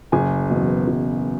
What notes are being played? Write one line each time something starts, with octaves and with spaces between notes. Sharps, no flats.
F#1 G#5
E2 B2 F#3
F#1